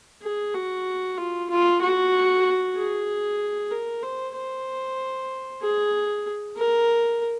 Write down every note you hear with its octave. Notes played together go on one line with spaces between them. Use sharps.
G#4
F#4
F4
F4
F#4
G#4
A#4
C5
C5
G#4
A#4